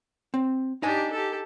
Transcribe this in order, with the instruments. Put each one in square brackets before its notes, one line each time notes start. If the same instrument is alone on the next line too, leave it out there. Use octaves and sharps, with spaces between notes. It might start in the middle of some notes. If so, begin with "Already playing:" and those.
[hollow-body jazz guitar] C4
[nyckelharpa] D4 G4 [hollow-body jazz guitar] D#4 D#5 G#5
[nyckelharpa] G4 A4